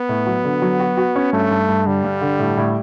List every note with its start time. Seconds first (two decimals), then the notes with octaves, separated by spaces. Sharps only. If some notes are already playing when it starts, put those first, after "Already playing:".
Already playing: B3
0.09 A2
0.27 F#3
0.44 D3
0.62 F#3
0.80 F#4
0.97 F#4
1.16 C#4
1.33 G2 A3
1.51 G2
1.69 G2
1.86 D3 G3
2.04 G2
2.21 D3
2.39 A2
2.57 A2